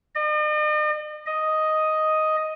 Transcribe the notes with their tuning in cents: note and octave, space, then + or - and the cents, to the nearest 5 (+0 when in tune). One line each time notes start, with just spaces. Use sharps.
D#5 -45
D#5 +5